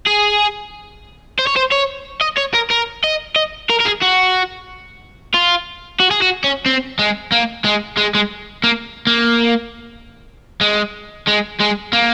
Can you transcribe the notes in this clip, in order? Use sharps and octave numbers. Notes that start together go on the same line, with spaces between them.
G#4
C5
C#5
C5
C#5
D#5
C#5
A#4
A#4
D#5
D#5
A#4
A#4
G#4
F#4
F4
F#4
G#4
F#4
C#4
C4
G#3
A#3
G#3
G#3
G#3
A#3
A#3
G#3
G#3
G#3
A#3